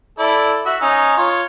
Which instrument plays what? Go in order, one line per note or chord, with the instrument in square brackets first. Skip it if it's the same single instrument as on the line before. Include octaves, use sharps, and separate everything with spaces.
[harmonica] E4 A4 D5
F#4 E5
C#4 D#4
F4 C#5